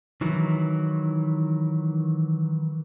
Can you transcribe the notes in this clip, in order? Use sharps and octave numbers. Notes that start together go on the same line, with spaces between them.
D#3 E3 F#3